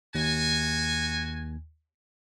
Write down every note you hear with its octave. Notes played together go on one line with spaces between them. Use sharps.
D#2 F#4 G#5